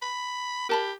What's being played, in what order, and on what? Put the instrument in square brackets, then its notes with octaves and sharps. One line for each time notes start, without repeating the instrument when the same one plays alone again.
[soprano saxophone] B5
[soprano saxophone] G4 [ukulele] A#4 A5 B5